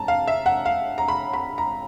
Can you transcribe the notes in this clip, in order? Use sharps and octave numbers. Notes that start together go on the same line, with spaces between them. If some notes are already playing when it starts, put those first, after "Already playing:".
Already playing: G#2 A5 A#5
F5
E5
F#5
F5
A#5
B5
B5
A#5